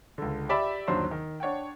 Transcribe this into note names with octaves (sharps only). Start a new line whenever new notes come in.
C#2 D3
G4 D5 E5 B5
G1 D#2 F#3 D4 C5 C6
D#3
D4 C#5 F#5 G5